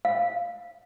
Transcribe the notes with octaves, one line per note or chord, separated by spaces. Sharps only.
F5